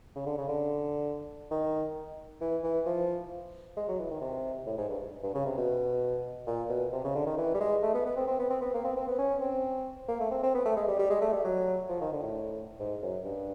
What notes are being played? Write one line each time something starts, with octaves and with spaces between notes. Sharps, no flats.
C#3
D3
C#3
D3
D#3
E3
E3
F3
G#3
F#3
E3
D#3
C3
A2
G#2
G2
G2
C#3
C3
B2
A#2
B2
C3
C#3
D3
D#3
E3
G3
G#3
A3
B3
B3
C4
C4
B3
C4
B3
A#3
C4
C4
B3
C#4
C4
A#3
A3
C4
C4
B3
A3
G#3
G3
G3
G#3
A3
G3
F#3
F3
D#3
D3
A2
G#2
F#2
G2